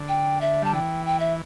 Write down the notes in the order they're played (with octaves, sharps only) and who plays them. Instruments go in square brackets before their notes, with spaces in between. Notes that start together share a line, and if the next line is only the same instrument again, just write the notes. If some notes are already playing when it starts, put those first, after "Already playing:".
Already playing: [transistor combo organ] D3
[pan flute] G5
E5
[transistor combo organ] G3 [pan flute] A5
[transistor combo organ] E3 [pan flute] G5
[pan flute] G5
E5